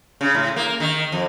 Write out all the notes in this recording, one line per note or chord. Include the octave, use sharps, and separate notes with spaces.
C#3
A2
A#3
D#3
F2